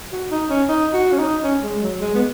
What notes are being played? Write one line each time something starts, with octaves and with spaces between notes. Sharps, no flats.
F#4
D#4
C#4
D#4
F#4
C#4
D#4
C#4
G#3
F#3
G#3
B3